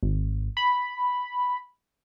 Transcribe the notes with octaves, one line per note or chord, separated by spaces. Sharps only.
G#1
B5